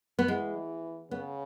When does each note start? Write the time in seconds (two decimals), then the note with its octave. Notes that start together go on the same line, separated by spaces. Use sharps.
0.19 B3
0.28 E3 G#3
1.11 C#3 B3